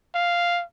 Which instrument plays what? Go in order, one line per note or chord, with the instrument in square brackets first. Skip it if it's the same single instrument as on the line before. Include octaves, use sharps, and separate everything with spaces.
[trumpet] F5